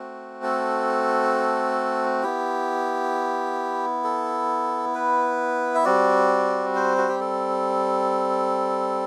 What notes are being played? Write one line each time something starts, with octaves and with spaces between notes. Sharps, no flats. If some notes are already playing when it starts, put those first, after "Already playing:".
Already playing: A3 C4 F#4
A4
B3 E4 G4
A4
B4
E5
G3 C4 F#4 D5
C5
F#4
G4
A4